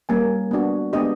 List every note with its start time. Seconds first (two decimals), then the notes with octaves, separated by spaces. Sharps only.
0.09 G3 A#3 C#4 G#5
0.51 B3 D4 F#4
0.93 G#3 B3 D4 G4 D#5